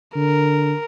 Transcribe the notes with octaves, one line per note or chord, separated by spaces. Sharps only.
D3 A#4